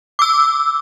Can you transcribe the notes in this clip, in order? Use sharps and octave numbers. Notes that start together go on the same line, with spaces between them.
D6 E6